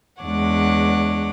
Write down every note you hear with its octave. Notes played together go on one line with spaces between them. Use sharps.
E2 G#3 D4 C#5 F#5 D6